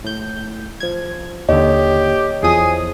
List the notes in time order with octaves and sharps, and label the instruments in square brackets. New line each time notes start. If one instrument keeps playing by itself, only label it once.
[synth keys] A2 G6
F3 G#6
[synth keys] D#2 D3 [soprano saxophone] G4 [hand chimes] C#5 D#5
[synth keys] E2 F3 D#6 [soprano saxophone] G#4